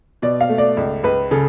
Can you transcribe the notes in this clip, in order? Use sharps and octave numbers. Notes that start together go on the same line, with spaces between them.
B2 D5
F5
A3
D5
C#2
C#2 B4
C#3 A4